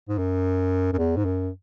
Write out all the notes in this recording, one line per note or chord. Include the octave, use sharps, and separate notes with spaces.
G#2
F#2
F#2
E2
G#2
F#2